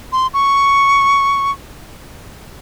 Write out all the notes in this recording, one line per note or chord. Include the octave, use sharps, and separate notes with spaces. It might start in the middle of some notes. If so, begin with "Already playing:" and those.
C6
C#6